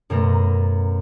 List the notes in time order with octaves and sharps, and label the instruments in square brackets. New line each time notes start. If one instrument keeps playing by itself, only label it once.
[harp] F#2 B2 A3 A#5